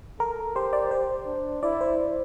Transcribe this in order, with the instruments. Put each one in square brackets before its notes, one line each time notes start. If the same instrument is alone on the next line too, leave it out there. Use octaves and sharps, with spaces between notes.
[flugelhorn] A4 [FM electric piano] A#4
[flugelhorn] G4 [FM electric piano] C5
[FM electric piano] D5
C5
[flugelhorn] D4
[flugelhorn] E4 [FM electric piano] D5
[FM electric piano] C5